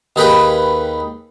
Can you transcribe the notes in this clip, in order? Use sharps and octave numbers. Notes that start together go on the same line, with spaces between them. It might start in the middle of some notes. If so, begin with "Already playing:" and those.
D#2 G#4 B4 G5